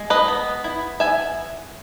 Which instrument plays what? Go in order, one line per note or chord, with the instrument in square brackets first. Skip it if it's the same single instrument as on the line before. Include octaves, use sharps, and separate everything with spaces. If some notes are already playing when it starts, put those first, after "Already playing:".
Already playing: [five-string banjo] G#3
B4 D#5
B3
E4
B3 E5 G#5